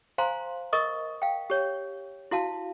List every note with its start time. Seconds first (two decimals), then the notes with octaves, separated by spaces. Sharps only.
0.18 C5 F5 G#5 A#5 C6
0.73 A#4 D#5 C#6 D#6
1.22 F5 G5
1.50 G4 C#5
2.31 E4 F#4 F5 A5